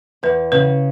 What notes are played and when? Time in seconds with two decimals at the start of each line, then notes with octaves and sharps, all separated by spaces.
0.23 E2 B4
0.52 C#3 B4